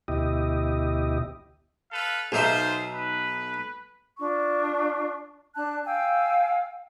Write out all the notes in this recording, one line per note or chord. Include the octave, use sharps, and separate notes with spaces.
D2 B2 E4 G4 D#5
A4 B4 F5
B1 D#4 F4 C5 E5
B4
D4 F4 C#6
D4 A5 F#6
F5 G5 G#5 E6